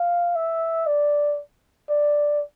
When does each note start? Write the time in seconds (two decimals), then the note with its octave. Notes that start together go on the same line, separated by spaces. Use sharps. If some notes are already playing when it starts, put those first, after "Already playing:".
Already playing: F5
0.35 E5
0.86 D5
1.89 D5